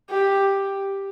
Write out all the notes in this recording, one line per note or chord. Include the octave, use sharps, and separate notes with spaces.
G4